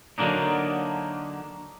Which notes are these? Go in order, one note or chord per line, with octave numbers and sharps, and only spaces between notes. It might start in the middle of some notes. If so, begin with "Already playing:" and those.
D3 F#3 A#3 D4 D#4